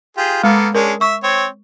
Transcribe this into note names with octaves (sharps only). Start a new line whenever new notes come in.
F4 G4 G#4
G#3 A#3 B3 A4
G#3 C#4 D4 A#4
E5 C#6
C4 C#5